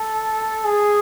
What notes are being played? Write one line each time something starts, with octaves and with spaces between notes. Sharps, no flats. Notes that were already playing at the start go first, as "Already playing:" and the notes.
Already playing: A4
G#4